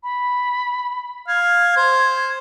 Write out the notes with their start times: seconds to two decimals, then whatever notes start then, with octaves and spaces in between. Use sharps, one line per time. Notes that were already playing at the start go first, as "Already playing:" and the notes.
0.03 B5
1.28 F5 G#6
1.77 C5